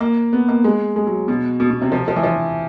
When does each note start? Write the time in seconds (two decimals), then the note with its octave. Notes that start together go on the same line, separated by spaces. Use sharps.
0.01 A#3
0.33 B3
0.48 A#3
0.64 G#3
0.96 G#3
1.07 F#3
1.28 B2
1.60 B2
1.71 B2
1.81 C3
1.92 F3
2.08 F3
2.16 E3
2.23 F3